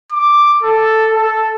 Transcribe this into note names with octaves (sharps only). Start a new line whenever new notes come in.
D6
A4
A4